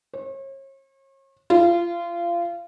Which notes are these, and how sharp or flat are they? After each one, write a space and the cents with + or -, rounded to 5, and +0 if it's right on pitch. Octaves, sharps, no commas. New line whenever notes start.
C#5 -40
F4 -25